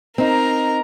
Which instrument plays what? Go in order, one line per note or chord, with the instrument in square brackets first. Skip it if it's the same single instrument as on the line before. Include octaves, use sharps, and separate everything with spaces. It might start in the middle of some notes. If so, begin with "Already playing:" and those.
[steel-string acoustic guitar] C4 D#4 [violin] A#4 A#5